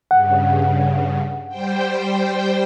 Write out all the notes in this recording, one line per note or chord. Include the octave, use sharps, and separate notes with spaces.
G2 C#3 F#5
G3 C5 G5